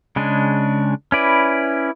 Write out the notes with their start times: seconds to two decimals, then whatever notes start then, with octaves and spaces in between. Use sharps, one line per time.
0.16 C#3 G#3 D4
1.12 C#4 E4 B4 D5